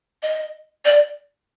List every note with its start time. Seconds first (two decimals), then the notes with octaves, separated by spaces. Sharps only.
0.22 D#5
0.85 D5